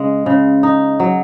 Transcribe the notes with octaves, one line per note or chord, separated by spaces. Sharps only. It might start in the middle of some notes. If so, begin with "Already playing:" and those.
Already playing: C#3 G#3
C#3
D#4
F#3